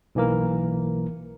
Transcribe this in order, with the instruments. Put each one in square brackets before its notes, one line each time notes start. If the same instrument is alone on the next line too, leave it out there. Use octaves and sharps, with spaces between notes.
[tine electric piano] B1 E3 A#3 A#4